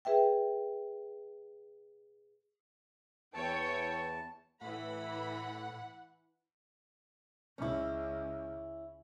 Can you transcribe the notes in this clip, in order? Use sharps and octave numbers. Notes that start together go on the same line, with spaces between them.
G#4 B4 E5 G5
E2 E3 C#5 G5 A5
A2 E3 F#5 B5
C#2 C#4 E4